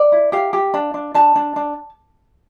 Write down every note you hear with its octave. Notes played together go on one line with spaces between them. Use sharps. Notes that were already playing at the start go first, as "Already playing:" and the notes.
Already playing: D5
E4
G4 F5
G4
D4
D4
D4 A5
D4
D4